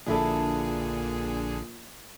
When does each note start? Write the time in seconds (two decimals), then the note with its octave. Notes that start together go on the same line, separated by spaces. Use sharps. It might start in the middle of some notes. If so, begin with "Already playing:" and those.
0.06 A#1 A#2 D3 D4 E4 G#4 A4